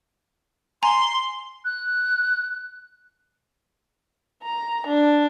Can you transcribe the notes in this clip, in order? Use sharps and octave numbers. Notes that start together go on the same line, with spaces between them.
G#5 A#5 C6
F#6
A#5
D4